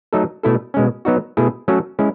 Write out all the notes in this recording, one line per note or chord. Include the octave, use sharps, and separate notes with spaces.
F#3 A3 D#4 A4
B2 A3 E4 A4
B2 G#3 C#4
F#3 B3 D#4 F#4
B2 A3 E4 G#4
F#3 A3 C#4 F#4 A4
G#3 C#4 E4